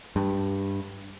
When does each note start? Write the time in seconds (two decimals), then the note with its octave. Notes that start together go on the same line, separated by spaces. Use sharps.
0.16 G2